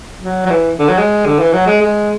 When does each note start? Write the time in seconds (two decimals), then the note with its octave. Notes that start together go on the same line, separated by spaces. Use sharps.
0.21 F#3
0.46 F#3
0.50 E3
0.79 D3
0.89 F#3
0.98 G#3
1.26 D3
1.39 E3
1.53 F#3
1.66 G#3
1.81 G#3